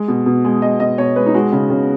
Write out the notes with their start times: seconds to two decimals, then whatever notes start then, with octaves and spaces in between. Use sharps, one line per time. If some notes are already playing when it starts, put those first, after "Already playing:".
Already playing: G#3
0.08 B2
0.26 B2
0.45 G#3
0.62 G#3 D#5
0.80 B2 D#5
0.98 B2 C#5
1.16 G#3 B4
1.26 D#4
1.34 G#3 F#4
1.52 C#3
1.70 C#3